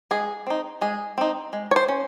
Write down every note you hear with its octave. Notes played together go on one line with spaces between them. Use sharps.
G#3 G#4
C4 D#4
G#3 G#4
C4 D#4
G#3
C#5
C5
C#4